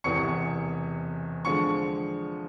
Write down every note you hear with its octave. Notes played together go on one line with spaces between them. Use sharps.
E1 E2 C3 E3 C#6 C#7
D3 F3 G#3 C#6 C#7